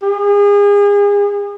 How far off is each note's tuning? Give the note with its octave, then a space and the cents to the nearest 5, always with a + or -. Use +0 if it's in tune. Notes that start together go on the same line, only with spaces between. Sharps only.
G#4 -35